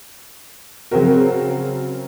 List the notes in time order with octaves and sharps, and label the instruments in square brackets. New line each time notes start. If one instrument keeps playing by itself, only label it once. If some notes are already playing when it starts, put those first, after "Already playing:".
[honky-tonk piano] C#3 F#3 C4 F#4 A#4